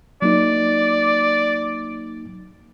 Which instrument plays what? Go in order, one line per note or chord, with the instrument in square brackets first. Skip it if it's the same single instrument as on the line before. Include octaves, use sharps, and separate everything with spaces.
[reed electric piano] F#3 A#3 D#4 [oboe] D5